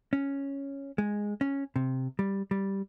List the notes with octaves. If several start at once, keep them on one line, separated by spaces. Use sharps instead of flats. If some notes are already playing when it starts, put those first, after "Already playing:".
C#4
G#3
C#4
C3
G3
G3